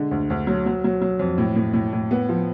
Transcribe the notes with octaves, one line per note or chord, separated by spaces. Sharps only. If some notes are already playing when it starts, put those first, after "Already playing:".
Already playing: D3 G#3
D2
D2
F#3
F#3
F#3
F#3
F2
A2
A2
A2
A2
B3
F3